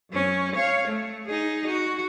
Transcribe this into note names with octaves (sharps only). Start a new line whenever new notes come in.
F#2 C#4
C#5 F5
A3
D#4 G#4
F#4